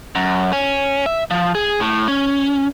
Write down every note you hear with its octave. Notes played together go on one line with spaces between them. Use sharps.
F#2
C#4
E5
F3
G#4
A2
C#4